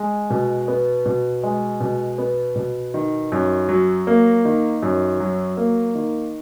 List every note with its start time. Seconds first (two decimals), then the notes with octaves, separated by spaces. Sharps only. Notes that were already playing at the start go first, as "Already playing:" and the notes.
Already playing: G#3
0.30 B2
0.68 B3
1.06 B2
1.43 G#3
1.81 B2
2.18 B3
2.56 B2
2.94 D#3
3.32 F#2
3.69 F#3
4.07 A#3
4.45 D#3
4.82 F#2
5.20 F#3
5.57 A#3
5.95 D#3